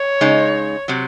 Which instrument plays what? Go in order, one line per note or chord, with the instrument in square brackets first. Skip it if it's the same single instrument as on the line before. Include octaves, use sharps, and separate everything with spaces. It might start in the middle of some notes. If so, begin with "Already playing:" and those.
Already playing: [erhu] C#5
[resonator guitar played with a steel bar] C#3 G#3 D#4
C3 F#3